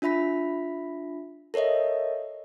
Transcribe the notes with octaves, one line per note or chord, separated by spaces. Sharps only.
D4 F4 E5 B5 B6
A4 A#4 C#5 D#5 E5